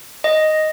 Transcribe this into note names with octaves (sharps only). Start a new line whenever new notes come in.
D#5